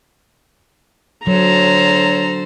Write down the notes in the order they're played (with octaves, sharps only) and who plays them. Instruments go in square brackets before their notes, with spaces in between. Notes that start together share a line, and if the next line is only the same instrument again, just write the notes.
[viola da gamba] D3 A4 C5 [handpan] F#3 [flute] C#5 [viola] A#5